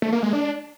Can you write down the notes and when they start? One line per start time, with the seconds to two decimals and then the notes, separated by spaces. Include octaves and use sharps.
0.02 A3
0.12 A#3
0.23 G#3
0.33 D4